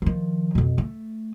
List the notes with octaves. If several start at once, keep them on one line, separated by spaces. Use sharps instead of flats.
D#3 F3
F2 B2
A3